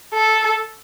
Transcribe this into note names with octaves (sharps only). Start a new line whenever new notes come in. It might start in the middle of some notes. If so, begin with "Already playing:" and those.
A4